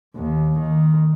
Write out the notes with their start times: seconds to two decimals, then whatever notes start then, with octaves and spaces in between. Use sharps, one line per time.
0.16 D#2
0.59 D#3